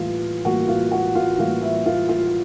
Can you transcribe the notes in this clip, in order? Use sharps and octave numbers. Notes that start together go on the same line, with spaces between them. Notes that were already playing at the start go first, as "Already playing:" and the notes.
Already playing: A2 E3 G3 A#3 F4 F5
A2 E3 G3 A#3 F#4 F#5
F4 F5
F#4 F#5
F4 F5
A2 E3 G3 A#3 F4 F5
E4 E5
F4 F5
F4 F5